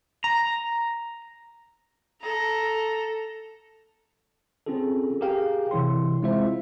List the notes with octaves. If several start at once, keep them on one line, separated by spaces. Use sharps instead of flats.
A#5
A4 A#5
C4 C#4 F4 G#4 A4
G4 G#4 A#4 F5 G5
C3 E3 E4 C#5 C6
G#3 C4 E4 F4 C5 E5